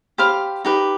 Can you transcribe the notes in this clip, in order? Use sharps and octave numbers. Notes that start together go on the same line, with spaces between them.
G4 C5 F5 B5
D#4 G4 B4